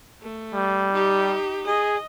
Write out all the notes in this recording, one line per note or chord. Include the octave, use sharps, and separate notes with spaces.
A3
G3
D#4 G4
G#4 D#5